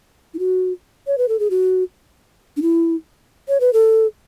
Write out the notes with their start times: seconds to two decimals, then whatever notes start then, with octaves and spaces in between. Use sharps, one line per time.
0.34 E4
0.39 F#4
1.07 C#5
1.18 B4
1.29 A4
1.40 G#4
1.50 F#4
2.57 D4
2.62 E4
3.48 C#5
3.60 B4
3.73 A4